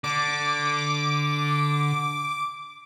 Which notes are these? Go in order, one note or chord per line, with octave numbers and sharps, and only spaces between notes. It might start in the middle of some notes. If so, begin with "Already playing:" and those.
D3 D6